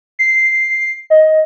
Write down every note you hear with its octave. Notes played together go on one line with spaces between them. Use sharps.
C7
D#5